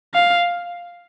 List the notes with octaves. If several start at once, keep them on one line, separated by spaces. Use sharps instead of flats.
F5